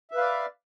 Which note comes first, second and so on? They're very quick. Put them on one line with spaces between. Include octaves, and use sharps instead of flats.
E5 B4 F5 D5